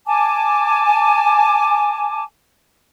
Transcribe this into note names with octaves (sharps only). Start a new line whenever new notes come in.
G#5 A5 D6